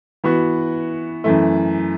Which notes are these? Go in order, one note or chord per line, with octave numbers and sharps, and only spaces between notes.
E3 B3 F#4
F#2 E3 A3